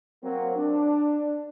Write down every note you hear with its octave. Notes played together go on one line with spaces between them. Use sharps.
F#3 A#3 C4
D4